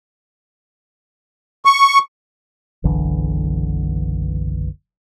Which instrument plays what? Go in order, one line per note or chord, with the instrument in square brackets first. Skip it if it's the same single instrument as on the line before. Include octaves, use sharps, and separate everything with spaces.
[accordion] C#6
[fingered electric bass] F#1 B1 D3 E3